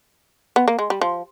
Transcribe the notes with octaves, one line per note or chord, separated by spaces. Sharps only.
B3
A#3
G#3
G3
F3